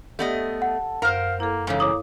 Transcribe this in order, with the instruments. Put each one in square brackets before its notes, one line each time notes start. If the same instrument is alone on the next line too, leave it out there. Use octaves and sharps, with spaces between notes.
[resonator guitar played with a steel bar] A3 B3 D#5 [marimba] G4 D5
[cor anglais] A4 [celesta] F#5
[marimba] F#2 [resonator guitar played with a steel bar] A#4 C5 [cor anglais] F5
[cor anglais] A#3 [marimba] E4 A4
[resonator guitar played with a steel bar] G#2 C#3 E3 [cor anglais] A#3 [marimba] A4 C#5 F5
[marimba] E4 [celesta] C#5 D6 D#6